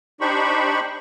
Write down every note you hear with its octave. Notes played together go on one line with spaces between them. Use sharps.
D4 D#4 G4 C5 B5 C#6